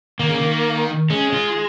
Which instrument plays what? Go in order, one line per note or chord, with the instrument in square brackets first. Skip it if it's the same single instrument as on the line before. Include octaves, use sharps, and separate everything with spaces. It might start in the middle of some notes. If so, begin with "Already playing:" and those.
[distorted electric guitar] D#3 [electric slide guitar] A#3
[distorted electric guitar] C#3
D#3
[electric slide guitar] G#3 [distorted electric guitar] C#4
[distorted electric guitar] F4